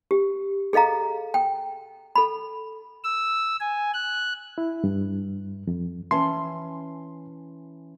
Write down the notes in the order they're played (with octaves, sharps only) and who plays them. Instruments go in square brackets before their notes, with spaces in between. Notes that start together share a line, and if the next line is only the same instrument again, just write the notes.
[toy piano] G4
G#4 A4 D#5 F5 A#5
G5
A4 B5
[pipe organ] E6
G#5
F#6
[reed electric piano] E4
G2
F2
[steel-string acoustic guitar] E3 C#4 A5 [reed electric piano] C6